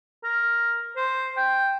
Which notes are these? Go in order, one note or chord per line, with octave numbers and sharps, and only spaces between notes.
A#4
C5
G5